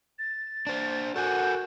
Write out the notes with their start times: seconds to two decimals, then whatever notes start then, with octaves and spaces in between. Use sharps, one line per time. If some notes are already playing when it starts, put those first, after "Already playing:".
0.19 A6
0.67 D4 C5
1.16 F#4 A4 A#4 F#5 G#5 G6